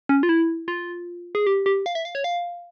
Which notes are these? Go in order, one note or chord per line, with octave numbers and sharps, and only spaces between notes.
C#4
F4
E4
F4
G#4
G4
G4
F5
E5
F5
C#5
F5